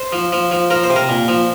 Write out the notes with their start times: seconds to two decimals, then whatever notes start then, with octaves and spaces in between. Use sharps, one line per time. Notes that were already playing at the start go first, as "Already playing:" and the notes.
Already playing: C5
0.13 F3
0.32 F3
0.51 F3
0.70 F3 A#4
0.83 C5
0.90 C3
0.96 A#4
1.09 A#2
1.28 F3